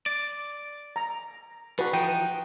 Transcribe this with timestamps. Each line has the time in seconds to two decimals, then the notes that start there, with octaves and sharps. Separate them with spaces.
0.06 D5
0.96 A#5
1.79 D3 F#4 B4
1.93 E3 F3 D#4 G5